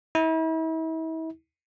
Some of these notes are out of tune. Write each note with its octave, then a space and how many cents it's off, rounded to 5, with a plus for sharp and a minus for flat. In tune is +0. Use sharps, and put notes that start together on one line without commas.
E4 -40